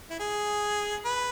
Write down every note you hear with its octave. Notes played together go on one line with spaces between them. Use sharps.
E4
G#4
B4